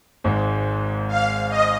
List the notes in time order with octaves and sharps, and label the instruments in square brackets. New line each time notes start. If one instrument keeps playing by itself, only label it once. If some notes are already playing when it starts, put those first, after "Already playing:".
[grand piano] G#1 G#2 G#3
[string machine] F5
D#5